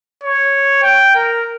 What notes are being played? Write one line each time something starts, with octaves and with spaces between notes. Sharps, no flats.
C#5
G5
A#4